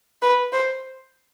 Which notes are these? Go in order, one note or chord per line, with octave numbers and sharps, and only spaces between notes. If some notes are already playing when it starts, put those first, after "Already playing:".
B4
C5